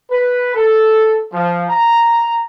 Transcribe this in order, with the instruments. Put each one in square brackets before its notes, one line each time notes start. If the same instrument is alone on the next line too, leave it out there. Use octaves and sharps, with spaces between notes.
[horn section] B4
A4
F3
A#5